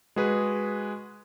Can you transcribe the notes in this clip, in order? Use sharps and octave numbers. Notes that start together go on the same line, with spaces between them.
G#3 F#4 G#4 B4